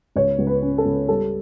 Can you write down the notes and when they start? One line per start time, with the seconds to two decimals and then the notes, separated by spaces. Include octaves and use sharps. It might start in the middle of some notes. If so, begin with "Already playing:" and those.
0.16 C#2 C#5
0.39 C#2
0.47 B4
0.62 C#4
0.78 A4
0.85 C#2
1.09 G3 A4